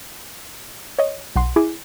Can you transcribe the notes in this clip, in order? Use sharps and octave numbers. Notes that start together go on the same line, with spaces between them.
C#5 D#5
B1 F#5 C6
E4 G#4 G#5 D6